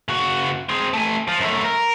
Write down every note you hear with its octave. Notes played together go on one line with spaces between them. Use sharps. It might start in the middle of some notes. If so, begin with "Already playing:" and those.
C#3 F#4
C4 G#4
A3 G#5
F3 F4
F#2 A3
A#4